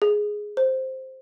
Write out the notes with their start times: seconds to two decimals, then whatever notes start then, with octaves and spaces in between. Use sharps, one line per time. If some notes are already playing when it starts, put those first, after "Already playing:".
0.02 G#4
0.57 C5